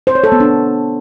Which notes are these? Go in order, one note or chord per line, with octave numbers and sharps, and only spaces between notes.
C5
C#5
A4
B3
D4